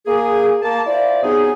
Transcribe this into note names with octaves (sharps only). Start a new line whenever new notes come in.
A#3 G#4
A#3 A5
E4 F4 C5 D5
C3 F#3 B3 D#4 G#4